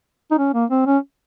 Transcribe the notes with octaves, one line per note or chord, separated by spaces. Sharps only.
D#4
C#4
A#3
C4
C#4